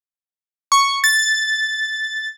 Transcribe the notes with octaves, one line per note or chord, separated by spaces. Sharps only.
C#6
A6